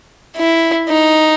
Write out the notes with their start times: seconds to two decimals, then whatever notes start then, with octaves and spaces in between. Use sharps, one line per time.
0.37 E4
0.88 D#4